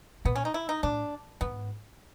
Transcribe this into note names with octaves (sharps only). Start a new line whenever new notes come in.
A#2 B3
C#4
D#4
E4
D#4
A2 D4
G#2 B3